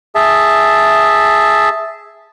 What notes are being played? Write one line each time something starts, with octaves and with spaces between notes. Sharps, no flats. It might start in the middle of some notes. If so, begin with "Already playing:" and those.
G#4 E5 A5